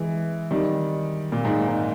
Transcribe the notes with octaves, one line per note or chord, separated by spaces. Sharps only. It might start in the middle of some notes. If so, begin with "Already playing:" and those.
Already playing: E3 G#3
D#3 G3
A#2
G#2
G#2